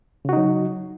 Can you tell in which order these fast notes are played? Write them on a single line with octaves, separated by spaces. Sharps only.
C#3 F#4 D#4 F#3